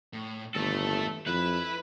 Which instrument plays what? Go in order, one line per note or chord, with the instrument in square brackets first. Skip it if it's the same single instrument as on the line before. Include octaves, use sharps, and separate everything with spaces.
[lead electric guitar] A2
[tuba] G1 [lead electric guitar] D#2 A2 [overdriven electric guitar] A3 A4
[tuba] F2 [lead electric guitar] E4 [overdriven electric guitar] B4